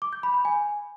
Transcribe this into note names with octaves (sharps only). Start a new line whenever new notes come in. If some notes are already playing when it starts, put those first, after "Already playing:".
D6
G6
B5
B5
G#5